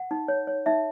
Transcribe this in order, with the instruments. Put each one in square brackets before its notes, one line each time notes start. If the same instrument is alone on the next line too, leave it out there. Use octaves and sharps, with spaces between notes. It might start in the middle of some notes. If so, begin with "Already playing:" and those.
Already playing: [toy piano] F#5
D#4
C#5
C#5
D#4 E5